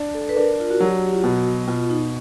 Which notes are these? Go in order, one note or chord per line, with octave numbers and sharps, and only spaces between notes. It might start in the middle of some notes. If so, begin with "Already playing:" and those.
Already playing: D4
A4
B4
D4 A#4
F4
F#4
F#3 G4
F4
B2 F#4
B2 F4
D#4